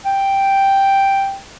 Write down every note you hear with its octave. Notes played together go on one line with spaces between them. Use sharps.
G5